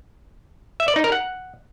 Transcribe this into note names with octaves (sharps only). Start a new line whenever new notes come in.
E5
D5
D#4
A#4
F#5